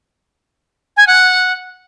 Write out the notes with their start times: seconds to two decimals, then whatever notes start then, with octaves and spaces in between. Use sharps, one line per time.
0.97 G#5
1.07 F#5